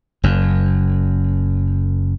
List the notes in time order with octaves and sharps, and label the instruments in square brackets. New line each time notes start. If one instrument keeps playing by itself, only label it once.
[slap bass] F#1 F#2